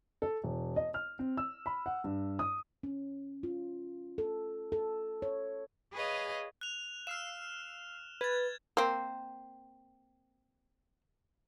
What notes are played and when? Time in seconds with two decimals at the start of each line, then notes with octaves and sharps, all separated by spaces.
0.22 A4
0.43 E1
0.76 D#5
0.94 F6
1.19 C4
1.37 E6
1.66 B5
1.86 F#5
2.04 G2
2.39 D#6
2.83 C#4
3.43 F4
4.18 A4
4.72 A4
5.22 C#5
5.93 G#4 B4 C#5 D#5 F5
6.61 F#6 F7
7.07 F5 E6 F6 C7 E7
8.21 B4 G#6 A6
8.77 A#3 C4